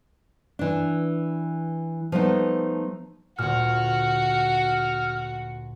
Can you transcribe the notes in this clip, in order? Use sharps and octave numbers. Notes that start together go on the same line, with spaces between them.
E3 D4
F3 G3 A3 B3 D#4
D2 A#2 F#4 F6